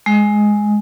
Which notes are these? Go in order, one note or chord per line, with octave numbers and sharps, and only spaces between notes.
G#3